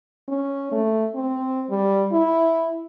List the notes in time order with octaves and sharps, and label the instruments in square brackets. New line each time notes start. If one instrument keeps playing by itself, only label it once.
[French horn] C#4
A3
C4
G3
E4